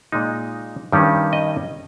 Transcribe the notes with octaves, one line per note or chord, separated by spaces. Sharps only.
A#2 G#3 D#4
G2 D#3 G3 C#4
D#5